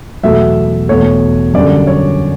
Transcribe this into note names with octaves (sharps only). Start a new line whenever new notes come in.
E2 B2 F#3 A3 E5
E2 B2 A3 C#5
F#2 D3 G3 D5
C#5